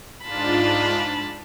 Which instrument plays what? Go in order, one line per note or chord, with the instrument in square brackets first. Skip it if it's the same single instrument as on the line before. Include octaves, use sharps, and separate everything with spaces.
[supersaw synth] G#2 D4 F4 [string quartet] A5 B5